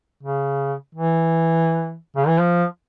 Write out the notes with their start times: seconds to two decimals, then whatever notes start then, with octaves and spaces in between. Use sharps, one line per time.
0.23 C#3
0.95 E3
2.17 C#3
2.28 E3
2.39 F3